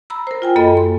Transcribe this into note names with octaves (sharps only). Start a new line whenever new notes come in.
A#5 B5 E6
A#4 C5
F4 G5 G#5
F#2 A#3 A4 D#5 B5
C6